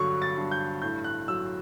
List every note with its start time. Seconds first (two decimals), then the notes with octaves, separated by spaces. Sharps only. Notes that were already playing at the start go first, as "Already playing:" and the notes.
Already playing: G2 D3 F#3 C#6
0.22 A6
0.37 G2
0.51 G6
0.82 A2 G6
1.04 F#6
1.28 F#3 E6